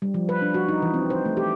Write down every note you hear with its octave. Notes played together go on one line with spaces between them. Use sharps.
G3
F3
B4
D4
F#4
D#4
E3
C4
C5
A3
G4